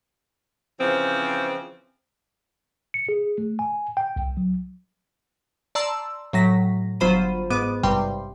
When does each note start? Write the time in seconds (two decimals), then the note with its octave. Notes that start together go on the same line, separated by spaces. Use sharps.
0.80 C#3 E3 F3 C4
2.94 C#7
3.09 G#4
3.38 A3
3.59 G#5
3.97 G5
4.16 C2
4.37 F#3
5.75 D5 A5 A#5 C6 E6
6.33 A2 F#3 A#6 B6
7.00 G1 F#3 F4 C5 B5 D#7
7.50 G#2 B3 D6 D#7
7.83 G#1 G2 C3 G3 G5 C6